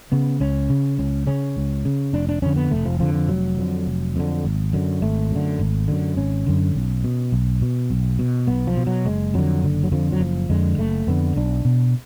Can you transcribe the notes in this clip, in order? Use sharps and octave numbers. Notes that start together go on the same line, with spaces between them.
C#3 B3
C#2 C#4
C#3
C#2 C#4
C#3 C#4
C#2
C#3
F1 D4
D4
F2 D3 C#4
B3
F1 A3
F3
F2 D3 F3
F3
F1 F#3
F2 D3
F1
F2 D3
G#1
F#2 D3
G#1 A3
F#2 D3
G#1
F#2 D3
G#1 C#4
F#2 D3
B1
B2
B1
B2
B1
B2
B1 B3
F3
B2
F#3
F#1 G#3
F2 D3 F#3
F#1 D3
F#3
F2 D3 F3
F#3
F#1 F3
F2 D3 G#3
F#1 A3
F2 D3 B3
B1 D4
B2